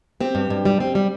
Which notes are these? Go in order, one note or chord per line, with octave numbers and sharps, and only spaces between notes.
C4 G4
G2
G2
G3
C4
G3